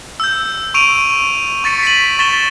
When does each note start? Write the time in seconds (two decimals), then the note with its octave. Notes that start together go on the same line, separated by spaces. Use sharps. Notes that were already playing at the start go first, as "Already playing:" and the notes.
0.20 E6 G6
0.74 C#6 E6 D7 D#7 F7
1.64 C#6 A6 B6 C#7
1.83 B6 D#7 F#7
2.19 C#6 A6 B6 E7 G7